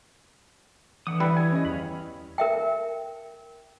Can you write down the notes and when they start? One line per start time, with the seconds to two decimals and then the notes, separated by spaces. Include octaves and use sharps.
1.07 D3 E3 F#5 D#6
1.20 G3 E4 B4
1.37 G#5
1.52 C#4 D#5
1.65 E2 F5 B5
2.38 A#4 E5 G5